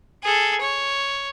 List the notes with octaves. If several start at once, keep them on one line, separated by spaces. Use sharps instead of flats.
G#4 A4
C#5